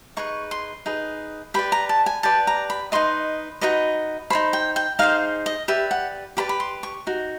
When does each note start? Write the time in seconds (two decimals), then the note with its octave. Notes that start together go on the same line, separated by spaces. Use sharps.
0.17 D#4 G#4 B4 C#6
0.51 C6
0.86 D#4 G#4 B4
1.54 G4 B4 D5 B5
1.72 A#5
1.89 A5
2.06 G#5
2.23 G4 B4 D5 A5
2.47 A#5
2.70 B5
2.92 D#4 F#4 B4 D#5 C6
3.61 D#4 F#4 B4 D#5
4.30 D#4 G#4 C5 B5
4.53 G5
4.76 G5
4.99 D#4 G#4 C5 F5
5.46 D#5
5.68 G4 B4 D5 E5
5.91 F#5
6.37 G4 B4 D5 B5
6.49 B5
6.60 C6
6.83 C#6
7.07 D#4 F#4